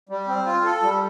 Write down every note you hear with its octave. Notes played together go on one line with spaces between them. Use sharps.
G3
C4
F4
A4
G3